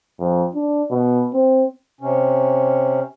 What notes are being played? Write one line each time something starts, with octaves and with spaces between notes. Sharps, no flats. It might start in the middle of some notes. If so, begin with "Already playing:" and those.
F2
D4
B2
C4
C3 C#4